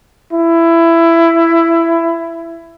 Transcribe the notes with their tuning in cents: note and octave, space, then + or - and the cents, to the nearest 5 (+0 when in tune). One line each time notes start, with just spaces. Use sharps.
E4 +15